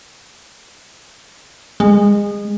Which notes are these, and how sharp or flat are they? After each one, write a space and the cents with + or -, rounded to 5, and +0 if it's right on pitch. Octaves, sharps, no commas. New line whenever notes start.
G#3 -25